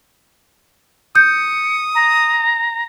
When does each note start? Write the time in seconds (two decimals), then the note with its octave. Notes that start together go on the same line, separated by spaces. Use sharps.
1.16 D#6 G6 C#7
1.95 A#5